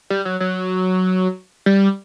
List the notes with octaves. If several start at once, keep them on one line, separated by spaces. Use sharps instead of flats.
G3
F#3
F#3
G3